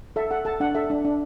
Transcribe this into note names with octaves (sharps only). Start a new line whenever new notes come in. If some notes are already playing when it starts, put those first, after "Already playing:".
A4 E5
A4 F#5
A4 A5
D4 F#5
A4 E5
D4
D4